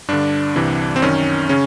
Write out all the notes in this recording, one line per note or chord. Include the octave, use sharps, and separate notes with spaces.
G2 D3 D4
C2 C3 E3
C4
F#2 D#3 C#4
C#3 C#4